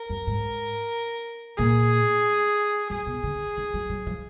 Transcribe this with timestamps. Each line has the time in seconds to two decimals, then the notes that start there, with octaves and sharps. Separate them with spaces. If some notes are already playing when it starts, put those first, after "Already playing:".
Already playing: A#4
0.10 F#2
0.27 G#2
1.58 A#2 G#4
2.90 F#3 G#4
3.07 B2
3.23 D3
3.57 D#3
3.74 F#3
3.89 F#3
4.06 F3